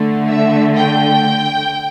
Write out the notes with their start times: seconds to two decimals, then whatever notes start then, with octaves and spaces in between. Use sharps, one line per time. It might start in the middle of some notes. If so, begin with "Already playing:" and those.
Already playing: D3 A3
0.27 E5
0.75 G5